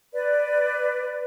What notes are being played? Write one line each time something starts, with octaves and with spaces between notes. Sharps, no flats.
B4 D5